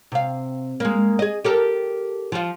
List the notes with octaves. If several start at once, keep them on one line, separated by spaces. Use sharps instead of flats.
C3 F5
G#3 A#3
G#4 D#5
G4 A4 A#4
F3 F4